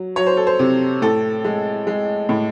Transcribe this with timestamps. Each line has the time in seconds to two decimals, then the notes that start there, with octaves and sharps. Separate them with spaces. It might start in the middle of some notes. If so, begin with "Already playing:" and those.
Already playing: F#3
0.16 F#3 C#5
0.27 C5
0.37 A4
0.47 C5
0.59 C3
1.02 A2 A4
1.45 G#3
1.87 G#3
2.29 A2